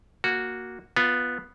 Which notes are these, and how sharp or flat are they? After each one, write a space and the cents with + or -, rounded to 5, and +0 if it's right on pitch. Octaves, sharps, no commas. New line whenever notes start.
A#3 +0 F#4 -5
B3 -5 F4 +5